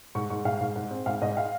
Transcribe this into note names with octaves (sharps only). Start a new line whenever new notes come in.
G#2 C#6
G#2 C#6
G#2 F5
G#2
G#2
C4
G#2 F5
G#2 D#5
F5